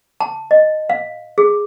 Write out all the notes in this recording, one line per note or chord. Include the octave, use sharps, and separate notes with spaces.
A5
D#5
F5
G#4